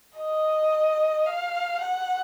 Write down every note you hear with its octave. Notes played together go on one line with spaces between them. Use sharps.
D#5
F5
F#5